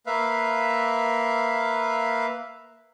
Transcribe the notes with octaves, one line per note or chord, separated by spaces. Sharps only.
A#3 B4 E5 F5